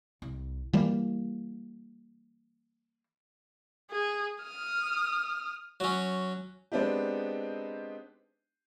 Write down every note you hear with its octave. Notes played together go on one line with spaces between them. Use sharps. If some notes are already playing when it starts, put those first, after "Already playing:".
C2
E3 G3 A#3
G#4
D#6 F6
F#3 C#4
G#3 B3 C4 D4 D#4 G4